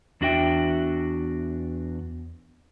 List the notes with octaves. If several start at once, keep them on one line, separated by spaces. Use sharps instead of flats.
E2 D4 F#4 E5 G5